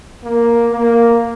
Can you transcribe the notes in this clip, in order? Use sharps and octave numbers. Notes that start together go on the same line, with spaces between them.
A#3
A#3